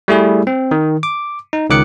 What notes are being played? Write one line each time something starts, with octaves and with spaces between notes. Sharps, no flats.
G3 A3 E4 G#4
C4
D#3
D6
D#4
C#2 D#3 D6 F#6 C#7